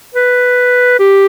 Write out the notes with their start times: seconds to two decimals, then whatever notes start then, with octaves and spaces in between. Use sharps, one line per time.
0.15 B4
0.99 G4